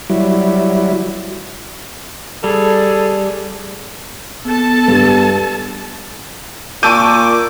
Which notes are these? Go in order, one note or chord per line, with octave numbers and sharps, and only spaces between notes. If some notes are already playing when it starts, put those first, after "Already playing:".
F#3 G3 E4
G3 G#4 A4
B3 A4 A5
G2 G3
A#2 A5 C#6 D6 E6 G6 D#7